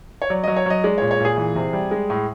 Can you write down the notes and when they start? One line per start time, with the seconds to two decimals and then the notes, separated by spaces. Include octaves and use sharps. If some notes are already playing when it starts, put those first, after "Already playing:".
0.22 C#5
0.30 F#3 D5
0.44 F#3 D#5
0.57 C#5
0.66 F#3 D#5
0.84 G#3 D5
0.98 A#2 C#5
1.11 C#5
1.20 A#2 G#4
1.37 E3
1.56 C3
1.73 G3
1.91 G#3
2.10 A2